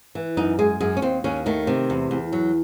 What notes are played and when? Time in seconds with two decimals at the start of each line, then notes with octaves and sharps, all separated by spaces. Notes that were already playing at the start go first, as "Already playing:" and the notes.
0.15 E3
0.37 F#2 D#4
0.59 G#3 G#4
0.80 F#2 G#4
0.97 C#4
1.02 D#2 C4
1.24 D#2 C#4
1.46 D#3 A3
1.67 C3
1.90 E2
2.11 E2
2.32 F#3